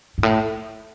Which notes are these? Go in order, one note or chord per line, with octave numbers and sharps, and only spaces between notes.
G#2
A2